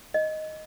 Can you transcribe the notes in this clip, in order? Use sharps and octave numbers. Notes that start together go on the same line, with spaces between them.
D#5